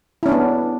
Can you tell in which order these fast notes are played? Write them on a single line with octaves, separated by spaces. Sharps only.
E4 C#4 D4 B3